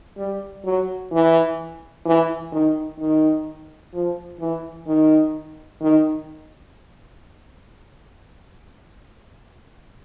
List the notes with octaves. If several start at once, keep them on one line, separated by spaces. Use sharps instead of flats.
G3
F#3
E3
E3
D#3
D#3
F3
E3
D#3
D#3